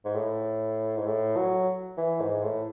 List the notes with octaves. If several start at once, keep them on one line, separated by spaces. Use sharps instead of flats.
G#2
A2
G#2
A2
F#3
E3
G#2
A2